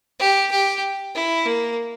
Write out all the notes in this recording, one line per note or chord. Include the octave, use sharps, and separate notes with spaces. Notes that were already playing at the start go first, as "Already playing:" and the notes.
G4
G4
E4
A#3